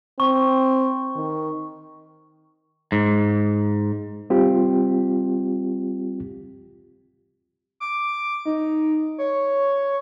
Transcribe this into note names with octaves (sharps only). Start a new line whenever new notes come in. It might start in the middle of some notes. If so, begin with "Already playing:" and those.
C4 C#6
D#3
G#2
G3 C4 F4 G4
D6
D#4
C#5